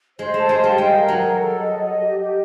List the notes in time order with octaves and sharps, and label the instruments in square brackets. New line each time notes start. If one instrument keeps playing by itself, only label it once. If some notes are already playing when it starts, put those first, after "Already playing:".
[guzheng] G#3 [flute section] C5
[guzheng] A3 [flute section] A5
[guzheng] G#3
[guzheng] G3 [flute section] F5
[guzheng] G#3 [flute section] G5
[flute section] A#4
[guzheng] F#3
[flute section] A#4
A4
D#5
D#5
G4
G4